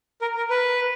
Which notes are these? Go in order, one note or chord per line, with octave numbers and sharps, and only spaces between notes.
A#4
A#4
B4